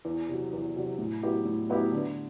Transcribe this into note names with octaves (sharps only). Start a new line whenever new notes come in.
E2
C3 F#3
E2
C3 F#3
A2
F#3 B3 E4 G4
A2
F#3 B3 E4 G4
D3